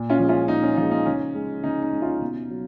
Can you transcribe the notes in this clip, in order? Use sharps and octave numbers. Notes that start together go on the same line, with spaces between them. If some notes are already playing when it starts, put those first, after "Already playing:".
Already playing: A#2
C#4 F4
F3 G#3
C#4 F4
A#2 D#4
C#4
F3 G#3 D#4
D#4
C#3 C#4
G#3
C#3 D#4
D#4
G#3
C#4 F4
B2
F#3